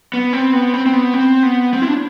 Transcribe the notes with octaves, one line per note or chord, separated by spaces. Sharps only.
B3
C4
B3
C4
C4
B3
C4
B3
C4
E4
D4